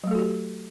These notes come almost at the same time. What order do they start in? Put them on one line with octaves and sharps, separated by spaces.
F#3 A3 A4 F#4 G4